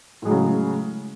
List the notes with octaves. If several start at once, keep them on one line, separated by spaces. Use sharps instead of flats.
A2 C#3 F#3 G#3